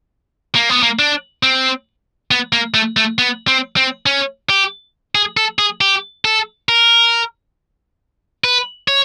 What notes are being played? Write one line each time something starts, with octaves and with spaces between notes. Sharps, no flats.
A#3
B3
A#3
D4
C4
B3
A#3
A3
A3
B3
C4
C4
C#4
G4
G#4
A4
G#4
G4
A4
A#4
B4
C#5